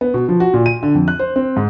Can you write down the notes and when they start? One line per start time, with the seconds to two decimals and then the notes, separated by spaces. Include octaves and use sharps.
0.01 B3
0.14 B2
0.28 F3
0.40 F#4
0.54 A#2
0.66 D#7
0.83 D3
0.95 F2
1.08 F#6
1.19 C5
1.36 C4
1.56 G#2